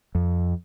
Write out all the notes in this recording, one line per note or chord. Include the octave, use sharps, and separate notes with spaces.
F2